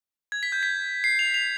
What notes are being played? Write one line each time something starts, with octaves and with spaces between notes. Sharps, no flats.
G#6
B6
G6
B6
C7
F7
F7